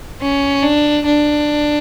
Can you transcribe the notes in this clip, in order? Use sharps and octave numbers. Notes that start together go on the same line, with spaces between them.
C#4
D4
D4